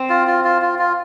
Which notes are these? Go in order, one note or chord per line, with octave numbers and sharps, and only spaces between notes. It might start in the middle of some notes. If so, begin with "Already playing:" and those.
Already playing: C4
F4
F4
F4
F4
F4